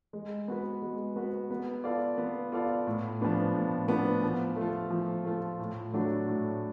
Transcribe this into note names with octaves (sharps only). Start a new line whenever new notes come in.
G#3
B3 F#4 B4
G#3
B3 F#4 B4
B3
F4 A4 D5 F5
B3
F4 A4 D5 F5
A2
F3 B3 D4
A2
F3 B3 D4
F3
A3 F4
F3
A3 F4
A2
F#3 A3 D4 F#4
A2